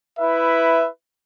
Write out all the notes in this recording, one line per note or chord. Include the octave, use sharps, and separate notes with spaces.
E4 B4 E5